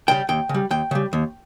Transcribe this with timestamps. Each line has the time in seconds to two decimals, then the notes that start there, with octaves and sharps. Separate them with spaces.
0.08 C#3 G3 G5
0.29 D#2 G5
0.49 C#3
0.54 G3
0.71 D#2 G5
0.91 C#3 G3
1.13 D#2